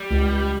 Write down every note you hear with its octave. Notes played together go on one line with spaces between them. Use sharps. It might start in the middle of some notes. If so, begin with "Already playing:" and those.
Already playing: G3
C#2
C#2